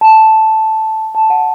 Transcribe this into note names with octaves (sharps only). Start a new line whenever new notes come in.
A5
A5
F#5